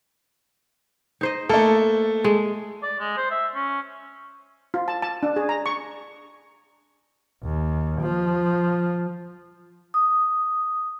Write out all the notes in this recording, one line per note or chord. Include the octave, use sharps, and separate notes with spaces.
D#4 C5 D#5
A3 A#3 A4
G#3
D5
G#3
C5
E5
C#4
F4
A5
A5
D4
G#4
A#5
C#6
D#2
F3
D#6